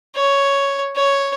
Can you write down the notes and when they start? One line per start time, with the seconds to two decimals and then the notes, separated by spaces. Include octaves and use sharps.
0.16 C#5
0.96 C#5